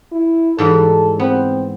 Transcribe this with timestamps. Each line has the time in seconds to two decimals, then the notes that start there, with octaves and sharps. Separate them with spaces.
0.12 E4
0.58 G#2 E3 G3 A4
1.20 B3 C4